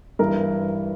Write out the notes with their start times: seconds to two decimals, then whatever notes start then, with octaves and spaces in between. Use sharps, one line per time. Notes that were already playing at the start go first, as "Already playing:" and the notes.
0.19 G2 E3 A#4